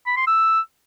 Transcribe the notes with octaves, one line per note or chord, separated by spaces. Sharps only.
B5
C6
E6